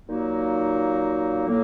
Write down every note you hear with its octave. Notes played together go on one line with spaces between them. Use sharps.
A#2 F#3 A#3 D#4 F#4
A2 F#3 A#3